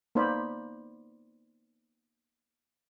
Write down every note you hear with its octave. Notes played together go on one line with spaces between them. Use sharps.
A#3 B3 D#4 C5 D5 B5